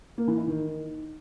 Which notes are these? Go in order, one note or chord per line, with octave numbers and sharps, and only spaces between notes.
A#3
E3
E4
D#3